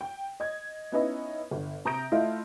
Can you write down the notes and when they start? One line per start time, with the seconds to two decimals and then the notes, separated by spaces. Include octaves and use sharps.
0.01 G5
0.40 D#5 G#6
0.92 B3 C#4 D#4 E4 B4 D#5
1.51 G1
1.85 C3 A#5 D#6 G6 A#6 D7
2.12 A3 E4 F4 D#5 E5